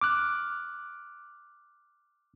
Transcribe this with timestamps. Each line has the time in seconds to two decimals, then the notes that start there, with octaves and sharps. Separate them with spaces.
0.01 D6 F6 F#6